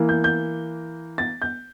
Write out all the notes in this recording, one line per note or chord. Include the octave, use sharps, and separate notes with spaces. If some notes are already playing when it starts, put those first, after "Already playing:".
Already playing: E3 A#3
G6
G6
A6
G6